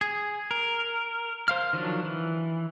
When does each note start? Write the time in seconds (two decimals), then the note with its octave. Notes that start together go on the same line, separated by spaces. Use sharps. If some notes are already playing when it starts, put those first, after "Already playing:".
0.01 G#4
0.51 A#4
1.48 C5 F5 F6
1.73 D#3 F3 F#3 D4
2.05 E3